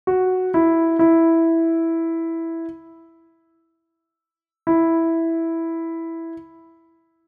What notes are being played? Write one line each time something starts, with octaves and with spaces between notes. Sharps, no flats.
F#4
E4
E4
E4